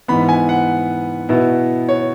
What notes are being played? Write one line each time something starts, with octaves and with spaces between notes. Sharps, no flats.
G#2 E3 B3 B5
G#5
F#5
B2 B3 E4
C#5